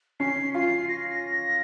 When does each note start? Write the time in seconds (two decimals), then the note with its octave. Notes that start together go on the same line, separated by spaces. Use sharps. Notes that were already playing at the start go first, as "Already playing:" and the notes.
0.20 C#4 C7
0.54 F4 C7
0.89 A#6
1.00 C7
1.09 A#6